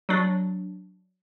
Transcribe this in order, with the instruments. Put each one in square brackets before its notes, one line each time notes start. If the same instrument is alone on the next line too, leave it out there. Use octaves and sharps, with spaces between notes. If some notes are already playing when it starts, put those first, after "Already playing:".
[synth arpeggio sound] F#3 D4